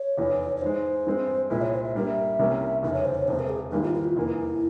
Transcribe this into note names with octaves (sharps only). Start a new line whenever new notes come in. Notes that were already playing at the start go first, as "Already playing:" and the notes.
Already playing: C#5
F1 E2 E3
C#5
G#2 E3 G#3 C5
G2 E3 G#3 C4
C2 A#2 G#3 E4 E5
C#5
C5
E5
G2 G3 A#3 E5
C2 C3 G3 A#3 C#4
F1 E2 C#3 E5
C#5
C5
C#5
E1 E2 C3 C5
A#4
G#4
G#1 G#2 E3 G3 A#3 E4
F4
E4
F4
F1 E2 E3 A#3 E4